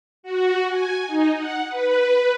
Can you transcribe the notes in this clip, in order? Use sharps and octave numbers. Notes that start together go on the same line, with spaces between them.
F#4
G#5
D#4
F#5
B4